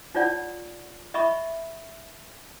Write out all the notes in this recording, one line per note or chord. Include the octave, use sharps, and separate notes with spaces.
D#4 F4 C#5 D5 F#5
D#5 E5 B5 C#6